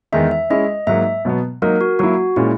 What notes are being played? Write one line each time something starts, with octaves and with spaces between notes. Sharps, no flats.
E2 D#3 G#3 D#4 E5
E5
G#3 C#4 E4 D#5
G#2 F#3 A#3 E5
B2 F#3 B3
F#3 A#3 D#4 A#4
F#4
F#3 A#3 E4 F#4
A#2 G#3 C#4 E4